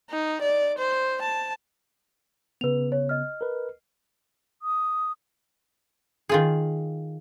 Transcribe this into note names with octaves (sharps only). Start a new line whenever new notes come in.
D#4
D5
C5
A5
C#3 B3 B4 F7
C#5
D#5 F6
A#4 B4
D#6
D#3 F4 G#4